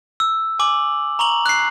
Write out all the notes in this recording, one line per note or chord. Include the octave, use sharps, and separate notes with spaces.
E6
G#5 D6 F#7
A#5 C#6 F7 F#7
F#6 C7